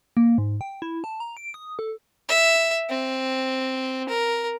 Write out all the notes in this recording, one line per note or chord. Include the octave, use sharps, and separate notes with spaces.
A#3
G#2
G5
E4
A5
A#5
D7
D#6
A4
E5
C4
A#4